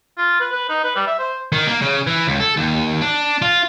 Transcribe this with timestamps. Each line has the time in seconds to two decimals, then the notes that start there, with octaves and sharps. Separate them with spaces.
0.18 F4
0.41 B4
0.53 B4
0.70 D#4
0.84 B4
0.96 G3
1.07 E5
1.19 C5
1.52 D#3
1.67 A#3
1.81 C#3
2.07 E3
2.27 C#2
2.40 A4
2.57 D#2
3.01 D4
3.42 F4